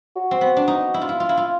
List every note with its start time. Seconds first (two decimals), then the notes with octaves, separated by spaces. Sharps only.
0.16 F#4
0.31 C4
0.41 B3
0.57 D4
0.68 D#4
0.94 E4
1.01 F4
1.09 E4
1.20 F4
1.29 E4
1.37 F4